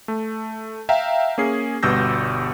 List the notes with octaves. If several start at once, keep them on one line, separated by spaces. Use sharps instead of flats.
A3
E5 F5 G5 A#5
A#3 C#4 G#4 C7
G1 B2 G3 E6 G6 A#6